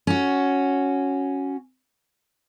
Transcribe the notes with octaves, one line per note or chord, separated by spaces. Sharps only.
C#4 F#4